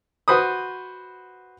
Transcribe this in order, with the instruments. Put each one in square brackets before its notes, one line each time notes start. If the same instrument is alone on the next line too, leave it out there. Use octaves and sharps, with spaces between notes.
[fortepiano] F#4 B4 C5 B5 D#6